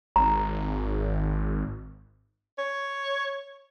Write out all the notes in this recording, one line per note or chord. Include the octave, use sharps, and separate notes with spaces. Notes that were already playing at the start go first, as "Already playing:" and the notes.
G#1 A#5
C#5